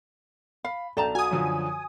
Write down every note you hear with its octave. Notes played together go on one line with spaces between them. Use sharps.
F5 B5
B1 A4 D5 G5 A5 A#5
F#4 G#5 D#6
F#2 D3 F3